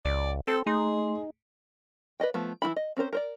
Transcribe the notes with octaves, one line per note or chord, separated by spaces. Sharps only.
C#2 D5
C4 A4
A3 D#4 G#4 C6
B4 D5 D#5 G5
F3 A3 B3
E3 F#3 E4 B5
D#5
C4 C#4 A#4 C5
A#4 C5 D5